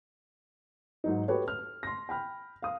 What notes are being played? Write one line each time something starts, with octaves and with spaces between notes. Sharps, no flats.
G#2 F#3 D#4
F#4 G4 A4 B4 C#5
F6
C6 A#6
G5 B5 F6
F5 D#6